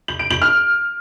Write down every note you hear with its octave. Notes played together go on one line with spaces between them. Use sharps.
F#7
D7
F#7
F6